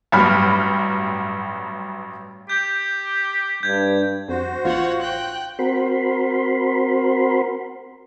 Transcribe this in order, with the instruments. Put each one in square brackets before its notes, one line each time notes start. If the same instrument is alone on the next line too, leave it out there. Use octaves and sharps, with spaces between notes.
[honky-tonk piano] A1 G2 F#3 G3 B5 F6
[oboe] G4 [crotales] G6
[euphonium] G2 [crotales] G6 G#6
[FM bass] F2 [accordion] F#4 C5
[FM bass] A1 [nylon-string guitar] F4 [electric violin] C#5 F#5
[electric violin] G5 F#6
[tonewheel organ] C4 F#4 A#4 B5 C6